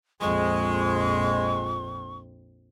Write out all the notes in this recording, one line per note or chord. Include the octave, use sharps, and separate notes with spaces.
A#1 F2 G#3 C#6